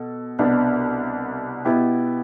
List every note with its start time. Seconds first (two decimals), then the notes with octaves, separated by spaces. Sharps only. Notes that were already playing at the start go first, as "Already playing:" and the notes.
Already playing: B2 A4
0.39 C2 B2 B3 D4
1.65 B2 B3 E4 G4